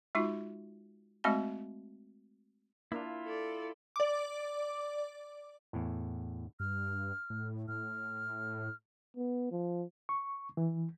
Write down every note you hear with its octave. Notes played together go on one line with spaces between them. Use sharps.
G#3 D#4 F4 F#4
G#3 A3 C4 F#4 D#5 B5
A#3 D4 E4 F4
A4 D5
D5 D6
E2 A2
G2 F6
A2
A2 F6
B3
F3
C#6
E3